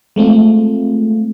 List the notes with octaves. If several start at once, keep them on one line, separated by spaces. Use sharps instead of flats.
G#3 A3 C4 F4